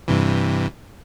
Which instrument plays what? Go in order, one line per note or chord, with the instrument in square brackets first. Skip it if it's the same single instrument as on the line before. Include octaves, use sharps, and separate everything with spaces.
[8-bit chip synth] G2 C3 E3